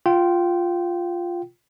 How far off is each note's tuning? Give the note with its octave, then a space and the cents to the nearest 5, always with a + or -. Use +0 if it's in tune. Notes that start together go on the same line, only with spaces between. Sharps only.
F4 +0 G5 -20